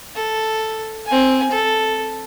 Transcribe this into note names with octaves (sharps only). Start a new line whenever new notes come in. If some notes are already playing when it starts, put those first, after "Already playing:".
A4
C4 G#5
A4